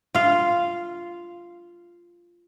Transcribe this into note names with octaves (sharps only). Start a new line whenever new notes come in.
F4 F5